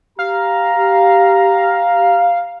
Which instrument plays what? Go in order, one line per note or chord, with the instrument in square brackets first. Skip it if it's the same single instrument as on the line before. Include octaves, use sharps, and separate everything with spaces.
[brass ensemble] G4 A#5 [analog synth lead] F5